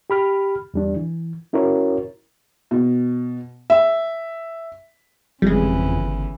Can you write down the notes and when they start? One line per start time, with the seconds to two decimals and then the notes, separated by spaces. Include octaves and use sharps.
0.10 G4 B5 F6
0.74 E2 G3 D4
0.96 E3
1.53 C#4 E4 F#4 A#4 C#5
2.71 B2
3.70 E5
5.42 G1 F2 C#3 E3 G3 G#3